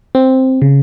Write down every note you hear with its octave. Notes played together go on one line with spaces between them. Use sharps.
C4
C#3